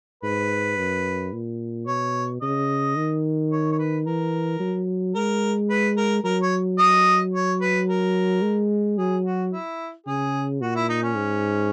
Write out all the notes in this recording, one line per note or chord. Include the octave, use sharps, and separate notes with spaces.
G#2 B4
F#2
A#2
B2 C#5
C#3 D#5
D#3
C#5
C#5
B4
E3 A#4
F#3
G#3 A#4
B4
A#4
F#3 A#4
C#5
D#5
C#5
B4
A#4
G#3
F#3 G#4
F#4
E4
C#3 G#4
A#2 F#4
E4
D#4
C#4
G#2